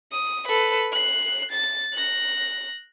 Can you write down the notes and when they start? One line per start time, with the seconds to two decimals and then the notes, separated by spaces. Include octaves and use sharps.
0.12 D#6
0.48 A4 B4
0.92 F#6 C7
1.52 A6
1.94 F#6 A#6